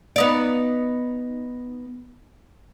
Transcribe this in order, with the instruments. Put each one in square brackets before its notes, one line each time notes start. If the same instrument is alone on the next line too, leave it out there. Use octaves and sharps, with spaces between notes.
[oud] B3 D#4 D5